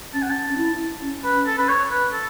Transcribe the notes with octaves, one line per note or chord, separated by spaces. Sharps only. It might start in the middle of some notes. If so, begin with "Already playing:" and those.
C#4 A5
F#5
A5
C#4
E4
C#4
B4
A4
B4
C#5
B4
A4